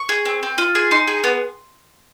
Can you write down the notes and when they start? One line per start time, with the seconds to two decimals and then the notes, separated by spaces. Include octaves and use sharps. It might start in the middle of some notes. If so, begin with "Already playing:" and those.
Already playing: C#6
0.09 G#4
0.25 C4
0.43 C4
0.58 F4
0.75 G#4
0.91 D#4 C6
1.07 G#4
1.24 B3